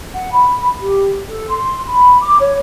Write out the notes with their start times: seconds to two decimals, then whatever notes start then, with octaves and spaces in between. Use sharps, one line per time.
0.14 F#5
0.32 B5
0.81 G4
1.27 A4
1.49 C6
1.87 B5
2.22 D6
2.40 C#5